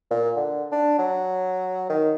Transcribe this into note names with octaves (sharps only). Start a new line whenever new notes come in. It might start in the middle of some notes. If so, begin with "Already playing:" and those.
A#2
D3
D4
F#3
D#3